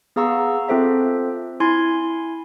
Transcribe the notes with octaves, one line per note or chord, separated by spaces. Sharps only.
B3 G#4 F5 A#5 C#6 E6
C4 F4 A4 C5 E5
E4 G#5 C6 G#6